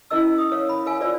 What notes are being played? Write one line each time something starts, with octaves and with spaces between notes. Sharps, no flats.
C#4 E4 A#4 D#5 E6
D#6
A#4 C#5 F5
B5
A#4 F5 G#5
F4 C5 D5 E6